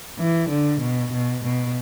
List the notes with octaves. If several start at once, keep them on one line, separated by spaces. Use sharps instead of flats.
E3
D3
B2
B2
B2